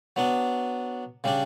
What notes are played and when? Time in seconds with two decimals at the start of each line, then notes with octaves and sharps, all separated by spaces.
0.16 F#3 B3 D4
1.24 C#3 G3 D4